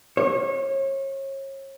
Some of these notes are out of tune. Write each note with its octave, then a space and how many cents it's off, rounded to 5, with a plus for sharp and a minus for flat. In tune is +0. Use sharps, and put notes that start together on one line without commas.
C#5 -35